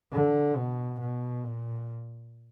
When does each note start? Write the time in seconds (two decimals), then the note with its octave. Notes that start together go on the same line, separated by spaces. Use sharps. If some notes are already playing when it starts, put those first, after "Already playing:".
0.13 D3
0.57 B2
1.01 B2
1.45 A#2